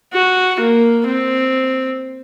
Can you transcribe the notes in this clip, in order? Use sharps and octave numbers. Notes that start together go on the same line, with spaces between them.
F#4
A#3
C4